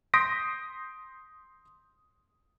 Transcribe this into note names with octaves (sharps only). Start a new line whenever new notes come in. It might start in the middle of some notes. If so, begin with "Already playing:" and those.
C6 D#6 G6 A#6 B6 D7